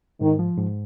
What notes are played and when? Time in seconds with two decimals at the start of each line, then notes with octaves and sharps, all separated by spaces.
0.20 G#2 D#3
0.39 F3
0.57 G#2